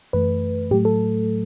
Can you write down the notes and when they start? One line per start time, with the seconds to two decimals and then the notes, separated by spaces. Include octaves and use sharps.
0.13 F#2 E3 A3 B4
0.71 A2 F#3 A3 G4
0.85 A4